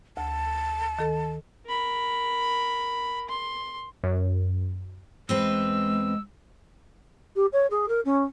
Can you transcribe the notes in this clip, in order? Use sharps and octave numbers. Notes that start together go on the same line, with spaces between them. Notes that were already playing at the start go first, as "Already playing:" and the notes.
D2 A5
D#3 A4 A6
A#4 B5
C6
F#2
E2 G#3 C4 B4 E6
G4
C#5
G#4
A#4
C#4